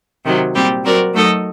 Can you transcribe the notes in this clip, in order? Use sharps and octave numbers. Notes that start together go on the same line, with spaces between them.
C3 D#3 F#3
A#2 G3 C4 G4
F#3 C4 F#4 A#4 D5
F#3 A3 D#4 A4 D#5